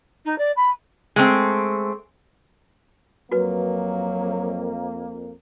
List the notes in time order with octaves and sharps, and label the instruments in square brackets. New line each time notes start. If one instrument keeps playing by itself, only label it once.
[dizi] D#4
D5
B5
[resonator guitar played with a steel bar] G#3 A3 C4
[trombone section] F2 A#3 [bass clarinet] F#3 [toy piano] F#4 B4